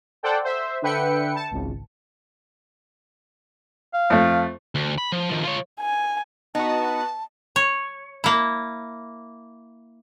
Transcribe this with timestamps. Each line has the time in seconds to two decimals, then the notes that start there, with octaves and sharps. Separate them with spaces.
0.23 A4 C5 D5 F#5 G5 A5
0.44 C5 E5
0.82 D3 B4 E5 G5 C#7
1.35 A5
1.51 G#1 C#2
3.94 F5
4.10 F2 A3
4.75 D2
4.98 B5
5.12 F3
5.29 D#3 F3
5.43 F4 C#5
5.81 G#5
6.55 B3 D#4 F#4 A5
7.56 C#5
8.24 A#3 E4